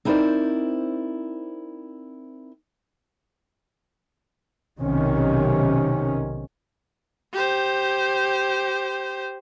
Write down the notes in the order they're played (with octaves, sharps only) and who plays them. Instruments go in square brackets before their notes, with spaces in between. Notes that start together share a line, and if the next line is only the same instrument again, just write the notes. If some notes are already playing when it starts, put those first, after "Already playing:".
[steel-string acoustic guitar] C4 D#4 E4 A#4 C5 D5
[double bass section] B1 C3 D#3 C#4
[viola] G4 C5